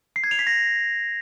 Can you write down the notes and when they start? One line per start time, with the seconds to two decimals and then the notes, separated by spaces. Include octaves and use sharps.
0.16 C7
0.24 G#6
0.31 F7
0.39 B6
0.47 A#6